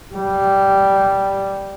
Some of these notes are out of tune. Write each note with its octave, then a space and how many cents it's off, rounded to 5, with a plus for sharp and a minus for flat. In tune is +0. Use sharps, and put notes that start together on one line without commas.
G3 -5